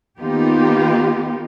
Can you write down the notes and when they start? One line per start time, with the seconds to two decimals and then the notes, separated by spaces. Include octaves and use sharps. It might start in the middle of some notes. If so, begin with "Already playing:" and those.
0.20 D#3 A#3 B3 D#4 F4 G4